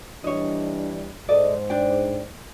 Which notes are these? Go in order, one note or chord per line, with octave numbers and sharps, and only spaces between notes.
E3 G3 D4 C#5 D#5
G#2 A4 C5 D5 D#5
D4 D5 G5